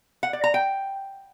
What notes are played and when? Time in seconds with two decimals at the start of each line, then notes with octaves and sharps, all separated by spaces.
0.23 F#5
0.33 D5
0.44 A#5
0.54 G5